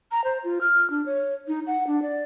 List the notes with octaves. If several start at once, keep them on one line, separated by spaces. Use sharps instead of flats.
A#5
C5
F4
F6
D4
C#5
D#4
F#5
D4
D5